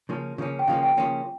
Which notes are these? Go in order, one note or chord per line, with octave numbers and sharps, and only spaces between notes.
C#3 F3 A#3 C#4
C#3 F3 A#3 C#4
G5
C#3 F3 A#3 C#4 F5
G5
C#3 F3 A#3 C#4